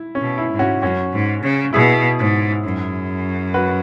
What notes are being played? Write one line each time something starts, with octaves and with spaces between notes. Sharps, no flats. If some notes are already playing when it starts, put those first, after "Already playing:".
Already playing: E4
C#4
B2
E4
G#2
C#4 F#4
F#2 C#4 F#4
G#2
C#3
B2 E4 G#4
G#2
F#2
F#4 B4